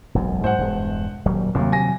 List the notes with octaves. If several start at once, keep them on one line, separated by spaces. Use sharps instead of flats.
E1 B1 F#2
G#2 F#3 C5 F#5
E1 G2 G#3
D#1 F#3 G3
D#2 C3 F#3 G3
G#5 A#6